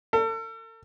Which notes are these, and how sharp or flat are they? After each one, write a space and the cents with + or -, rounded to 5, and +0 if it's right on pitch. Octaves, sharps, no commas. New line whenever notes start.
A4 +40